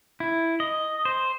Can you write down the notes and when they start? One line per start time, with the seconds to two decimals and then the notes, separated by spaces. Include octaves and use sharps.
0.20 E4
0.60 D#5
1.05 C5